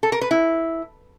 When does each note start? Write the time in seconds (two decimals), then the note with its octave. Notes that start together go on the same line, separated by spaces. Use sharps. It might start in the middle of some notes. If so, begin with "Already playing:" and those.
0.03 A4
0.12 A#4
0.21 B4
0.31 E4